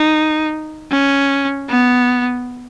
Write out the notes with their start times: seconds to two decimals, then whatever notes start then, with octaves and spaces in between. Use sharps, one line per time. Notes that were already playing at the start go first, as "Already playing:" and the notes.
Already playing: D#4
0.91 C#4
1.69 B3